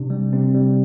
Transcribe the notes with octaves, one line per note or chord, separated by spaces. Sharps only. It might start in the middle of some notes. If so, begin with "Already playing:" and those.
Already playing: C3 D4
G3
C3 C4
G3